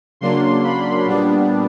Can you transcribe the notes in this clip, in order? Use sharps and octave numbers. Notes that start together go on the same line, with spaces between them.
C#3 F#3 A#3 D4 C6
B5
A#2 G3 B3 D4